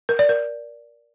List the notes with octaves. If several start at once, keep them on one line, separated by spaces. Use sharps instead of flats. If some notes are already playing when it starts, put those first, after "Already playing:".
A#4
D5
A#4